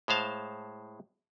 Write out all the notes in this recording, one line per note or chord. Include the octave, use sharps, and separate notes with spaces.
A2 G#3 C5 F5 A5